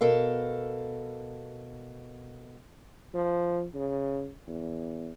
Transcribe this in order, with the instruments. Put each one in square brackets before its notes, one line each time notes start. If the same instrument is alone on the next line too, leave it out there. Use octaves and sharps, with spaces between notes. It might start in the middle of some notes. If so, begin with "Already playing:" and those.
[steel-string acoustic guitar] B2 A4 A#4 F5
[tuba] F3
C#3
E2